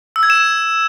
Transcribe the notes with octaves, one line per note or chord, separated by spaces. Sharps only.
E6
G#6
E7